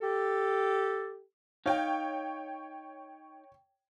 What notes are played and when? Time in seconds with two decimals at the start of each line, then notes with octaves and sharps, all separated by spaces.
0.01 G4 A4
1.66 D#4 C#5 F5 G5